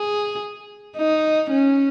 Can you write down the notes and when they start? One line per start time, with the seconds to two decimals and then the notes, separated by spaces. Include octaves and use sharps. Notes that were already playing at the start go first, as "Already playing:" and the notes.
Already playing: G#4
0.97 D#4
1.50 C#4